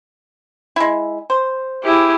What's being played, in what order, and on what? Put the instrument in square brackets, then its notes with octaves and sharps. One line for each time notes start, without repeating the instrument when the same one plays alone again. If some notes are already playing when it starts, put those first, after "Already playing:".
[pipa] G#3 E4
C5
[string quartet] E4 G4 G#4